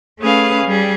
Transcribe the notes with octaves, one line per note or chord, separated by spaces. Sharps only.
A3 C#4 G#4 B4 F5
G3 G#4